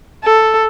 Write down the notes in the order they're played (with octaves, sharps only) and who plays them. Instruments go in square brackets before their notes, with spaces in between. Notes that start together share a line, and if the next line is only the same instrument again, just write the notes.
[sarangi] A4